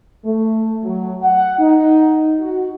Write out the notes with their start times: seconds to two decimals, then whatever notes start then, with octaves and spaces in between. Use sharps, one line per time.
0.25 A3
0.84 F#3
1.22 F#5
1.59 D#4
2.40 F#4